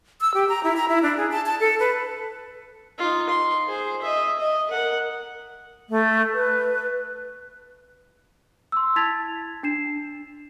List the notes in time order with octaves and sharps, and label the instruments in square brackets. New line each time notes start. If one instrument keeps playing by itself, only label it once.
[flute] E6
G4
A#5
E4
A#5
E4
D4
G#4
A5
A5
A4
B4
[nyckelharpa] D#4 F4
C6
G#4 C5
D#5 E5
D#5
A#4 F#5
[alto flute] A3
B4
[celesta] C6 E6
E4 A5 G#6 A6 B6 F7
D4 C7 E7